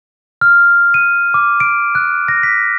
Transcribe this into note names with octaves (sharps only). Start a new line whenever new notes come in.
F6
D#7
D6
D7
F#6
A#6
B6